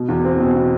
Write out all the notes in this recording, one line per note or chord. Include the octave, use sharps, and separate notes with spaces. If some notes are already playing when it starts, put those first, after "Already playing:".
Already playing: B2
E2
C4
B2
B2